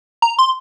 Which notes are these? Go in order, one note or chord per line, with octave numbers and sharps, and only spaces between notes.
A#5
C6